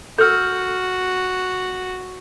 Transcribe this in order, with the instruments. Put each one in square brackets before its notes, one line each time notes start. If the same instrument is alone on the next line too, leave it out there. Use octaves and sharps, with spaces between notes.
[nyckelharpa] F#4 [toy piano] A4 E6 [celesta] F6 G6